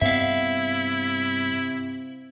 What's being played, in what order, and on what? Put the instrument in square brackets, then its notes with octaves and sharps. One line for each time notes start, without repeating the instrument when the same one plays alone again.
[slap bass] G2 B3 [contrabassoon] C3 [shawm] E4 [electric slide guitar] E5 F5